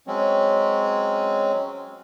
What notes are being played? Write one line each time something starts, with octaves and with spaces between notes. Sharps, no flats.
F#3 G#3 C4 C#4